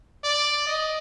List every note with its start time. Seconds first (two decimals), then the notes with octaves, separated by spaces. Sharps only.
0.24 D5
0.67 D#5